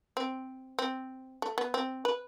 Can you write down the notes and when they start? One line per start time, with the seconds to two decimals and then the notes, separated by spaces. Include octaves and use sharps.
0.17 C4
0.79 C4
1.42 A3
1.58 B3
1.74 C4
2.05 B4